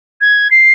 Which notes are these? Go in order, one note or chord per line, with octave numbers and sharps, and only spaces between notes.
G#6
C7